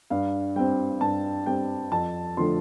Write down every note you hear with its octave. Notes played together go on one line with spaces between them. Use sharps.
G2 F5
G3 C4 G5
G2 A5
G3 C4 G5
F2 A5
D3 F3 A3 C6